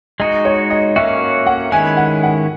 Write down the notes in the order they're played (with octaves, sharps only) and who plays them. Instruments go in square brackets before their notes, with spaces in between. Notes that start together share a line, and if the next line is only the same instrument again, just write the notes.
[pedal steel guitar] G#3 D#4 F#4 [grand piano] D#5
[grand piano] C#5
D#5
[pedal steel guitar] A#3 C#4 F#4 [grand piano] E5
[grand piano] F#5
[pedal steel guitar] D#3 G#3 C#4 E4 B4 [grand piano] G#5
[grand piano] F#5
F#5